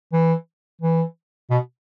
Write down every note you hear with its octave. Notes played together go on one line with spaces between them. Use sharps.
E3
E3
B2